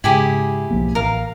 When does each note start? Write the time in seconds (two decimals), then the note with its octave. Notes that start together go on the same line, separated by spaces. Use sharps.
0.04 G#2 C#3 E4 G4 G#4
0.70 B1 F3 A#3
0.95 A1 A#4 F5